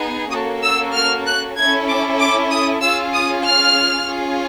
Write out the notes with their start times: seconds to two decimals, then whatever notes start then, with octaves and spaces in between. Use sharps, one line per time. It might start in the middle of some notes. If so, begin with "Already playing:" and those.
Already playing: B3 D#4 G#4
0.32 A#3 C#4 F#4 A4 D#6
0.64 E6
0.94 F6
1.26 F#6
1.57 C#4 E4 A4 G#6
1.89 D6
2.20 D6
2.51 D#6
2.82 C#4 F4 G#4 E6
3.14 D#6
3.46 F6
4.07 C#4 F4 G#4